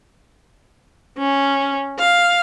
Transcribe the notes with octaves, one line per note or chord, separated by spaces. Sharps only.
C#4
F5